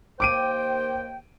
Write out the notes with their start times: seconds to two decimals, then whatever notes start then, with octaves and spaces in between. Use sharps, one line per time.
0.20 D#2 A#3 C5 G5 D6 D7 D#7